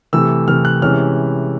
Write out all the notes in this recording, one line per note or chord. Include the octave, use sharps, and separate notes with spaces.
C3 E3 A3 E6
C3 E3 A3 F6
F#6
C3 E3 G#3 C#4 E4 F6